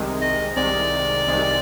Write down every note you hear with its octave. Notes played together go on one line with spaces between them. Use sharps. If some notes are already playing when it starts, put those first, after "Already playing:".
Already playing: C2 C3 D#3 G#3
D#5
C2 C3 D#3 G#3 D5
C2 C3 D#3 G#3